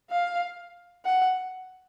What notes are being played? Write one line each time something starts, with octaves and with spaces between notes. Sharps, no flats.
F5
F#5